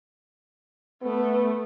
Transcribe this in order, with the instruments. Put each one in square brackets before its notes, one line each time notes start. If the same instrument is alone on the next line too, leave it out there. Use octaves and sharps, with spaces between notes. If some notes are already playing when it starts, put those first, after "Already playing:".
[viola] A3 [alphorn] B3